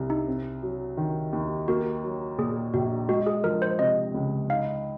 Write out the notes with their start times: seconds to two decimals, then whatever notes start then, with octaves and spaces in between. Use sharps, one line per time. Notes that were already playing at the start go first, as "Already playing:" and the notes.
Already playing: C2 C3
0.10 D#4
0.28 C4
0.62 F#3
0.97 D#3
1.33 D#2
1.68 A#3 F#4
2.03 F#3
2.38 A#2 G#4
2.74 A#1 F#4
3.09 G#3 F#4
3.27 G#4
3.44 F3 A#4
3.62 C5
3.79 C3 D#5
4.14 C#2
4.50 D#4 F5